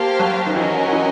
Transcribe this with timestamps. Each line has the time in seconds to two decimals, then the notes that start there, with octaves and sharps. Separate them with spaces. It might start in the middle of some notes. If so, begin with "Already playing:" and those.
Already playing: A#3 G4 C5 F5 A5
0.20 F#3
0.46 D#3
0.56 E3 C#4 F#4 A#4 D#5
0.92 E3